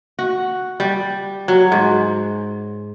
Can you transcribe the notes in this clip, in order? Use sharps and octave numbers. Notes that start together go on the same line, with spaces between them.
F#4
G3
F#3
G#2